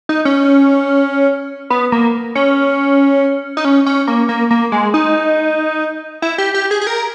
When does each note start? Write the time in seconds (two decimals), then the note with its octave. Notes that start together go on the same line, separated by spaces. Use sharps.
0.09 D#4
0.25 C#4
1.70 B3
1.92 A#3
2.35 C#4
3.57 D#4
3.65 C#4
3.86 C#4
4.07 A#3
4.29 A#3
4.51 A#3
4.72 G#3
4.94 D#4
6.22 E4
6.38 G4
6.54 G4
6.71 G#4
6.81 G#4
6.87 A#4